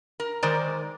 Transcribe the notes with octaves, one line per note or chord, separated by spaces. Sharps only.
A#4
D#3 G#3 A#4 C5 D5